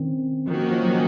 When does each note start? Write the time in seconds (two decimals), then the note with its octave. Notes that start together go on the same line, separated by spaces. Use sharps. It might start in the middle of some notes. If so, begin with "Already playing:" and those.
Already playing: D#3 C4 C#4
0.48 D#3 F3 A#3 C#4 F#4
0.71 F3
0.83 F#3